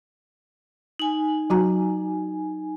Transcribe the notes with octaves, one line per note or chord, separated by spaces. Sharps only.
D#4 G#5
F#3 F#4 A#5